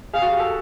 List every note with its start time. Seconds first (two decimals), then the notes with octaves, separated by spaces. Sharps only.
0.13 G#4 F5
0.22 F#4
0.31 G4
0.40 A4